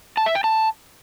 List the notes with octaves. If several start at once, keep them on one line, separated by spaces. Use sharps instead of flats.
A5
E5
G5
A5